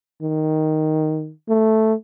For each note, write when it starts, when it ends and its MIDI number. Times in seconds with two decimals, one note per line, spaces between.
0.22 1.31 51
1.49 1.94 57